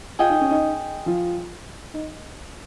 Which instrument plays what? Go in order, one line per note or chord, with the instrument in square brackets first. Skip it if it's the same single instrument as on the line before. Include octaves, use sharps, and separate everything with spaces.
[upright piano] F4 [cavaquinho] G#4 D#5 G5
[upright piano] D#4
C#4
D#4
F3 F4
D#4